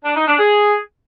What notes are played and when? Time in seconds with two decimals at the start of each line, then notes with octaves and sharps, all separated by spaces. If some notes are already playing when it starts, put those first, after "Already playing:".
0.05 D4
0.16 D#4
0.28 D4
0.39 G#4